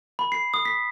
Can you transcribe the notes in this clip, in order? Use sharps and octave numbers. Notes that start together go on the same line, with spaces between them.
B5
C7
D#6
B6